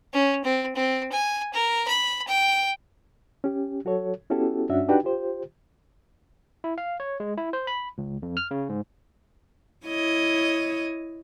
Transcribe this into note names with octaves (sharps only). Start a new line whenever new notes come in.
C#4
C4
C4
G#5
A#4
B5
G5
C#4 G4
F#3 F#4 A4 C#5
B3 C#4 E4 F#4 G4 A4
G2 C#4 D4 F#4 E5
D4 D#4 F#4 G4 B4 G5
F4 G4 C5
E4
F5
C#5
G#3
E4
C5
B5
C#2
F2
F6
C#3
G#2
E4 C#5 D#5